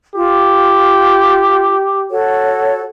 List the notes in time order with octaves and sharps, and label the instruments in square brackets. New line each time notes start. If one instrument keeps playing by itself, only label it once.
[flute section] F4 [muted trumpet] G4
[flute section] F#4 A4 C#5